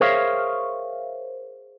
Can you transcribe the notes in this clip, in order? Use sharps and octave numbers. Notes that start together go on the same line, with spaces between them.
G#4 A#4 C5 C#5 E5 F5